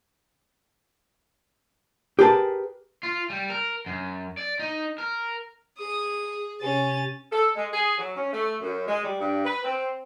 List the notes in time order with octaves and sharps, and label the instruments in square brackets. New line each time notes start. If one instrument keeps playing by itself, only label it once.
[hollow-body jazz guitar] G4 G#4 A#4 B4 A5
[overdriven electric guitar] F4
G3
A#4
F#2
D5
D#4
A#4
[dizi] G#4 [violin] D#6
[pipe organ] C3 G#5 [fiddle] C#4 [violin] A6
[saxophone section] A4
G#3
G#4
F#3
C#4
A3
F#2
G#3
G3
G2
B4
C4